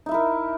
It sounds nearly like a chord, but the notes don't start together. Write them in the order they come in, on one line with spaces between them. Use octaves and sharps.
D#4 E5 E4 A#4